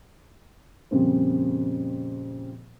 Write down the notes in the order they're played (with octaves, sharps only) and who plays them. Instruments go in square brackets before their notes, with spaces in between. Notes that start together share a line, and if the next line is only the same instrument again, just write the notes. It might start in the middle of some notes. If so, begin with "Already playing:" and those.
[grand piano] F2 A#2 C#3 G3 C4